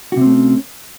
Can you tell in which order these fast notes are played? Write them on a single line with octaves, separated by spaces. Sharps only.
F#4 C3 C4 A3 C#4